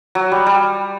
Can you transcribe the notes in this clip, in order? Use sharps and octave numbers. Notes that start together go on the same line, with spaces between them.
F#3
G3
G3